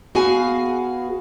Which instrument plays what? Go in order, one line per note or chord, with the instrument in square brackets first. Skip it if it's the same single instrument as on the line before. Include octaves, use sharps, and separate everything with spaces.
[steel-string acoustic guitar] B3 F#4 G#4 F5 G#5